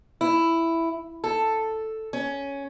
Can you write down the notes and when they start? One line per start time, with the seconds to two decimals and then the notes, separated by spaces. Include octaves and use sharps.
0.21 E4
1.24 A4
2.13 C#4